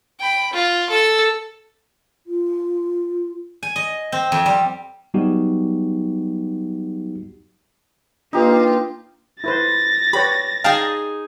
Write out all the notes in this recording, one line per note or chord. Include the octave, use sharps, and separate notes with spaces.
G5 B5
F4
A4 E6
F4
G#5
D#5
C4
F2
G3
F#3 G3 B3 D#4 F#4 G4
A#3 D4 D#4 F4 G4 B4
E4 B4 C5 A6 A#6
G4 B4 C#5 B5
D#4 G#4 F5 G5 A5